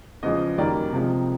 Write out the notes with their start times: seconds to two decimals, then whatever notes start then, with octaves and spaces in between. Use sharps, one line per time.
0.23 E2 C#3 F3 G#3 D#5
0.58 F#2 D#3 G3 A#3 D5
0.93 C3 F3 G#3